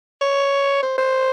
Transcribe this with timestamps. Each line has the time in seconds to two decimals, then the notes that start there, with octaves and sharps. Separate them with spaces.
0.21 C#5
0.82 C5
0.98 C5